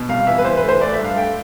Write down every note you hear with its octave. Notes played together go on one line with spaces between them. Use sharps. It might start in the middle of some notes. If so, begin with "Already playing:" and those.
Already playing: B2
C2 F5
E3 E5
B4
E3 C5
B4
A3
C5
A3 D5
E5
G2
F5
A3 G5